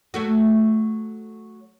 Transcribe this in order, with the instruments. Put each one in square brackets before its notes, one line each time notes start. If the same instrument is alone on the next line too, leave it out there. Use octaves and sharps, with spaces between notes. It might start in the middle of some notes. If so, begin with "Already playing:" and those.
[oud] F#3 A3 F#4